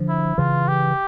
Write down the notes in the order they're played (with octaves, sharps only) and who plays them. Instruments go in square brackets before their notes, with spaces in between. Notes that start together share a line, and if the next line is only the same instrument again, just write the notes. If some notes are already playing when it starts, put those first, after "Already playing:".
Already playing: [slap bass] D3 F3
[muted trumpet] E4
[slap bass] C#3 E3 [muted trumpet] F4
[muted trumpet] G4